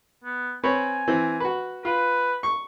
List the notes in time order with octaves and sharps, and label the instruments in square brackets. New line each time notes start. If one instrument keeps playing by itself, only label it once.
[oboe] B3
[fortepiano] C4 B4 C#5 [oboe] G#5
[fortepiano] E3 C4
F#4 B4
[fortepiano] F4 [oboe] B4
[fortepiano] C#6